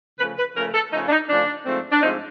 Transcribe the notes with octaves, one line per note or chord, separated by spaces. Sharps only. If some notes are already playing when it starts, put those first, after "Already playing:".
C#3 F3 A3 B4
B4
C#3 F3 A3 A#4
A4
C#3 F3 A3 D#4
D4
D#4
C#3 F3 A3 D4
G#2 F3 A3 C4
D4
G#2 F3 A3 C4 D#4